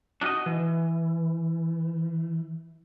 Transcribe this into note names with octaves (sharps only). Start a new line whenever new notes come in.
D4 D#4 F4 F#4 D#5
E3